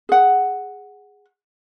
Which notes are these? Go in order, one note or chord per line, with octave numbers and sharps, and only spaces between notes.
G#4 F#5